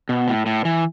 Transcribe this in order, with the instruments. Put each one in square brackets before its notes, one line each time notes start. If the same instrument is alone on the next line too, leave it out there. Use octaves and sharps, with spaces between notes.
[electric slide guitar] B2
A2
A2
E3